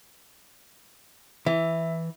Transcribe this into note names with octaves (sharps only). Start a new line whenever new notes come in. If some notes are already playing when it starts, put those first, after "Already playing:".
E3 E5